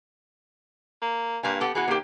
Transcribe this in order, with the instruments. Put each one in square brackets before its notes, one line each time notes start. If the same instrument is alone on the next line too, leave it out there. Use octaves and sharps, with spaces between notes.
[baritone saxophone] A#3
[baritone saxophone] G2 [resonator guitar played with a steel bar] A#3 F5 G#5
[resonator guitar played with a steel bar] B3 G4 A4
[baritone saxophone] E3 [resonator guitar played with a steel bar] B3 F#4 G#4
[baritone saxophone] D#2 [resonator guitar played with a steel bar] A#3 G4